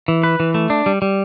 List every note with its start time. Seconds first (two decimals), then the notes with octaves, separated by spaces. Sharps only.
0.08 E3
0.24 B4
0.40 E3
0.55 A3
0.70 D4
0.86 G3
1.02 G3